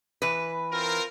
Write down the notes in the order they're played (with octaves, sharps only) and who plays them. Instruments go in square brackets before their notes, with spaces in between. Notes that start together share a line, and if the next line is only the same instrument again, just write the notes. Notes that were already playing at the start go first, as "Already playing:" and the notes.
[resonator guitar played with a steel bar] E3 B4
[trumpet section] C4 F4 A#4